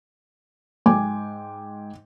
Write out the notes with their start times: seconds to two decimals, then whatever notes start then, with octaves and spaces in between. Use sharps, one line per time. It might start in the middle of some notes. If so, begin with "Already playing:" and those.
0.86 G#2 G5 G#5 D6